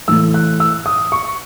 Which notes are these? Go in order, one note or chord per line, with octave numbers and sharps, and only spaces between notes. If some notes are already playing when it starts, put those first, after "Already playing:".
A2 E3 A3 E6
F#6
E6
D#6
C#6